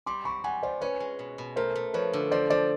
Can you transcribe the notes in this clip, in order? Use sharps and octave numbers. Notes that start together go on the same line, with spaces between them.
G3 C6 D6
C4 B5 C#6
G3 F#5 G#5
F4 C5 D5
C#4 B4 C#5
G#3
B2
B2
A3 A#4 C5
A3
F3 B4 C#5
D3
F3 C5 D5
F3 C5 D5